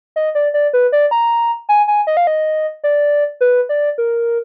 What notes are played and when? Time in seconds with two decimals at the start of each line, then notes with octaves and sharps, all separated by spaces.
0.16 D#5
0.35 D5
0.54 D5
0.73 B4
0.92 D5
1.11 A#5
1.69 G#5
1.88 G#5
2.07 D#5
2.17 F5
2.27 D#5
2.84 D5
3.41 B4
3.69 D5
3.98 A#4